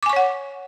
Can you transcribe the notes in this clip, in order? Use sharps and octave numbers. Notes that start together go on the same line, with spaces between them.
C#5 F#5 G#5 C#6 D6